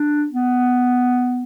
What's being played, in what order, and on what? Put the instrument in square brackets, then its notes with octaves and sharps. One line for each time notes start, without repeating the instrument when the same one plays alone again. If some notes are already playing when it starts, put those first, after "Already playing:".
Already playing: [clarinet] D4
B3